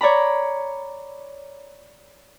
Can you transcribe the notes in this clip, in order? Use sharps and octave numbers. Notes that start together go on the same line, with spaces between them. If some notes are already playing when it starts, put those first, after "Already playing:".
C#5 D5 A#5 B5